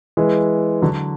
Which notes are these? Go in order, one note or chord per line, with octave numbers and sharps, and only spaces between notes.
E3 G#3
D3 F#3